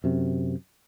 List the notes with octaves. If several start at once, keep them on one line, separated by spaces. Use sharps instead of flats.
F#2 C3